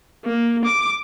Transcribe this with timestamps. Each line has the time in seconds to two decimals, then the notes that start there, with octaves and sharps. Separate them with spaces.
0.25 A#3
0.65 D6